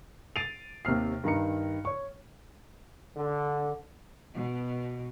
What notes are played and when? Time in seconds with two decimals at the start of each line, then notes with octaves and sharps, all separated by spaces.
0.36 A6 C7 D7 D#7 F7
0.85 D#2 C3 C4 F6 C7
1.24 G2 D#3 A#5 C#7
1.85 C#5 C#6
3.17 D3
4.32 B2